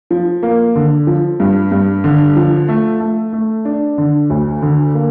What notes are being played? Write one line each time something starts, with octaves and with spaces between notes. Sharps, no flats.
F3
A#3
D3
F3
G2
G2
D3
F3
A3
A3
A3
D4
D3
D2
D3
A#3